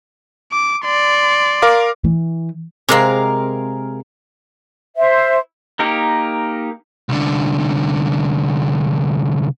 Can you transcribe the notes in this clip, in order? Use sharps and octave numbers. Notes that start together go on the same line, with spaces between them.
D6
D5 C6
A#4 F5 D6
E3
C3 G#3 C4 G#4 A#4 F5
C5 E5
A#3 D#4 G4 A#4
C2 D3